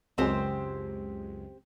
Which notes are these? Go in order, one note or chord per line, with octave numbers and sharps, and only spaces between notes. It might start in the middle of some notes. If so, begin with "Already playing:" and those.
C#2 F#2 G#3 C4 G4 C5